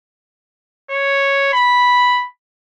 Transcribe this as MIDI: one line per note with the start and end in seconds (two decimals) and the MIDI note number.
0.90 1.48 73
1.53 2.25 83